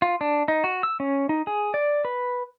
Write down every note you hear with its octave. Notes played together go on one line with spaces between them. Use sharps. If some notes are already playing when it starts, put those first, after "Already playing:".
F4
D4
D#4
F#4
E6
C#4
D#4
G#4
D5
B4